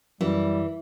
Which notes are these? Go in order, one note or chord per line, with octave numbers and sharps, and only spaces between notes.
F#2 E3 G3